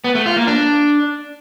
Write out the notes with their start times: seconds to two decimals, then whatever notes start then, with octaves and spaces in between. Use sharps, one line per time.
0.04 B3
0.15 A3
0.26 F4
0.37 A#3
0.47 D4